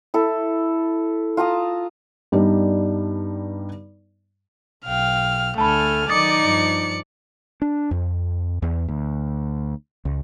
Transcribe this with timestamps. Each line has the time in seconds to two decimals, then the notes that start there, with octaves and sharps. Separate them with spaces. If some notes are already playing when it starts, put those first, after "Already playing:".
0.14 E4 A4
1.37 F4 A5 A#5 D#6
2.32 G2 G3 B3 D4 D#4
4.86 B1 F5 G5 F6
5.58 D2 D3 A3 A4 G#5 A5 B5 F6
6.09 D#3 F#3 D#4 D5 D6 D#6 A6 C#7
6.43 G2 F3
7.62 D4
7.91 F2
8.62 E2
8.88 D2
10.05 C#2